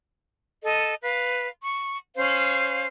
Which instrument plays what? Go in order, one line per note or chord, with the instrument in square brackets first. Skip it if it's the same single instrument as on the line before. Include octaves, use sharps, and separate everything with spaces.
[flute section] A4 D#5
B4 F5
C#6
C#4 C5 F5